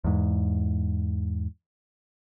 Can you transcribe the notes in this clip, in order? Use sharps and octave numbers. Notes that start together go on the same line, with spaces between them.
E2 G#2